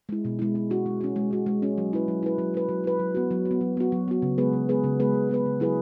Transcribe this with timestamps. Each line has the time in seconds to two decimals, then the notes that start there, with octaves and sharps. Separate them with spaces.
0.09 G#3 E4
0.25 B2
0.39 G#3 E4
0.55 G#3
0.70 C#4 F#4
0.86 G#3
1.01 C#4 F#4
1.16 G#3
1.31 C#4 F#4
1.46 G#3
1.62 C#4 F#4
1.78 F#3
1.93 E4 B4
2.08 F#3
2.23 E4 B4
2.38 F#3
2.54 E4 B4
2.69 F#3
2.84 E4 B4
2.99 F#3
3.15 B3 F#4
3.31 F#3
3.45 F#4
3.51 B3
3.61 F#3
3.77 B3 F#4
3.92 F#3
4.08 B3 F#4
4.22 C#3
4.38 G#3 B3 G#4 B4
4.53 C#3
4.69 G#3 B3 G#4 B4
4.84 C#3
5.00 G#3 B3 G#4 B4
5.14 C#3
5.29 G#3 B3 G#4 B4
5.46 C#3
5.60 F#3 E4 G#4 B4